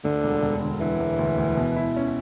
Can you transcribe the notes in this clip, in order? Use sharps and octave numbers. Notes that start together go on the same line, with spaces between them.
D2 D3
E1
E1
D3
D3 E3
E1
D2
D2
B2
E4
C#4